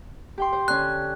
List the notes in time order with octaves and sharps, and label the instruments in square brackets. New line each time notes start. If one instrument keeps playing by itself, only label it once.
[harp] G4 G5 C6
C5
[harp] D3 C#4 [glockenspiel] F#6